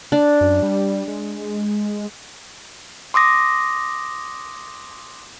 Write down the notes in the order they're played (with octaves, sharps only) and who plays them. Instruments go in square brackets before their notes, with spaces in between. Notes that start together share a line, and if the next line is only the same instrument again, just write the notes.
[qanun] D4
[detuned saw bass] F#2
G3
G#3
[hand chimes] C6 D6 D#6 A#6